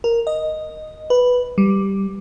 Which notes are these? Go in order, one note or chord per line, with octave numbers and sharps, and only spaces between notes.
A#4
D#5
B4
G3